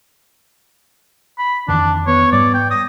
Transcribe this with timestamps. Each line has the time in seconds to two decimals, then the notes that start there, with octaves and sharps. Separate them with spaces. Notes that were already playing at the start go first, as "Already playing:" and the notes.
1.39 B5
1.68 F2 D#3 E3 D4 A5
2.07 B3 C#5
2.32 G#2 G3 D5
2.54 G5
2.71 D#6 A#6